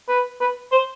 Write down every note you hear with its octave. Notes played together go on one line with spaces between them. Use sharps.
B4
B4
C5